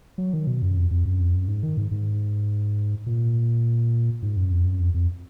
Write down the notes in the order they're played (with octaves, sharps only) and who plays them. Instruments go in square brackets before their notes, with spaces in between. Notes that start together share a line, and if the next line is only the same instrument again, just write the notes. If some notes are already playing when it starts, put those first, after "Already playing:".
[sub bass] F#3
D#3
B2
F#2
F2
F2
F#2
F2
F#2
G#2
D#3
G#2
G#2
A#2
G#2
F#2
F2
F#2
F2
F2